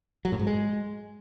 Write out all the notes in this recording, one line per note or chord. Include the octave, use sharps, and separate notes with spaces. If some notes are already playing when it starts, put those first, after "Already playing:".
F#3
A2
G#2
G#3